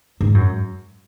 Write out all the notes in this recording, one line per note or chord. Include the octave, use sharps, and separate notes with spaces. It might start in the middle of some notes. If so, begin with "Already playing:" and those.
G#2
F#2